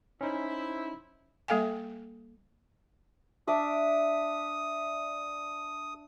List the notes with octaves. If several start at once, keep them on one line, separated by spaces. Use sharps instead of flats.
C#4 D#4 E4 C5 E5
G3 A#3 A4 F5 G5 G#5
D4 E5 D6 D#6